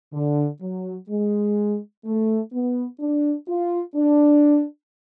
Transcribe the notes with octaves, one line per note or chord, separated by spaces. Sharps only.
D3
F#3
G#3
A3
B3
D4
F4
D4